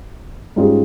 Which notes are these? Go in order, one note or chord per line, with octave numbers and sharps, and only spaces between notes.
G#2 G3 C#4 F4 G#4